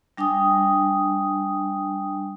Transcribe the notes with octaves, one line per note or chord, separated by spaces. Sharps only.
G3 D4 G5 G#5 D#6